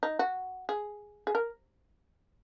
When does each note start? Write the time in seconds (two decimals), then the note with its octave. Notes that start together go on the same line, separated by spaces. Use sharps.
0.03 D#4
0.19 F#4
0.69 G#4
1.27 G#4
1.35 A#4